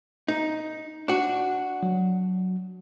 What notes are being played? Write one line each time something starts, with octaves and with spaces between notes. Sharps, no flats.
D#4
D4 F#4
F#3